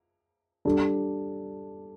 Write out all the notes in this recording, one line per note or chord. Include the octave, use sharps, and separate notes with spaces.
G3 D4 A4